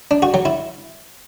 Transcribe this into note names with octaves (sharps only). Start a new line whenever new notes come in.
D4
F#4
F#3
E4